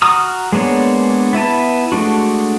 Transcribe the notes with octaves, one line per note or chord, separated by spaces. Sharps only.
F#4 A#5 D#6 F6
G#3 A#3 B3 D4 C#5
B3 E4 B4 A5
G#3 A3 D4 F#4